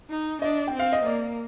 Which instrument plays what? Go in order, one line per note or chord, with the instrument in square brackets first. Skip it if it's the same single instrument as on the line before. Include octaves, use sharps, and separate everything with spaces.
[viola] D#4
[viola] D4 [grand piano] D#5
[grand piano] G5
[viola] C4
[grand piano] F5
D#5
[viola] A#3 [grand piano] D5